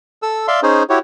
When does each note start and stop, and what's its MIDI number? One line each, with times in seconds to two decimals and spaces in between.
0.22 0.47 69
0.22 0.47 88
0.48 0.60 74
0.48 0.60 76
0.48 0.60 77
0.48 0.60 84
0.63 0.83 61
0.63 0.83 63
0.63 0.83 68
0.63 0.83 72
0.90 0.99 64
0.90 0.99 66
0.90 0.99 67
0.90 0.99 73